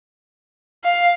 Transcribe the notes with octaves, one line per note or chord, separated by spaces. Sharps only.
F5